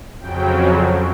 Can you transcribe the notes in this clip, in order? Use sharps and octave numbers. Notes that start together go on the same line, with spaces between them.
F2 C#3 F#3 G5